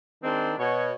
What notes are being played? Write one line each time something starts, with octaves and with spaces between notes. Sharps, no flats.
D#3 G#3 C4 D4
B2 C#5